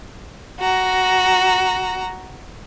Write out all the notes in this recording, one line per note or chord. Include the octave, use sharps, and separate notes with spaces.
F#4 A#5